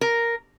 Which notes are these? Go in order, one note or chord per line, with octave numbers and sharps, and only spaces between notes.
A#4